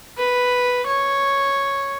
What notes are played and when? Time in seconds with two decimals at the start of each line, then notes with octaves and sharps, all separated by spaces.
0.18 B4
0.86 C#5